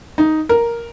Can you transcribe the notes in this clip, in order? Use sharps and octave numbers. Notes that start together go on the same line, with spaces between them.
D#4
A#4